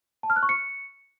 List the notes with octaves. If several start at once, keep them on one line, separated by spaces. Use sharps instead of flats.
A5
F6
F#6
C#6
C#7